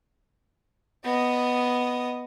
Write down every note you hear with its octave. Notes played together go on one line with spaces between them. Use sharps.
B3 D#5